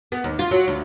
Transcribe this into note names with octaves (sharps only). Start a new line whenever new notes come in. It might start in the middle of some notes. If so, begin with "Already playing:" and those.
B3
D#2
F4
F#3
D2